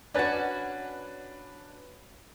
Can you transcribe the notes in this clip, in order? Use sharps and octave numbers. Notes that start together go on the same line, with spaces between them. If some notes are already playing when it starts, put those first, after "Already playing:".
C#4 D4 F#4 B4 A6